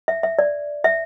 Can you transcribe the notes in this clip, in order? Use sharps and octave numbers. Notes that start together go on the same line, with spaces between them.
E5
E5
D5
E5